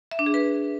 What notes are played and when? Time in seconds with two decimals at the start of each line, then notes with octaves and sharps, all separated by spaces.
0.11 E5
0.19 D4
0.26 G#4
0.34 B4